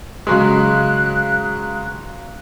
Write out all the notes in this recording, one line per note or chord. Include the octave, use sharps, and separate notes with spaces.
C#3 F#3 G#3 F#6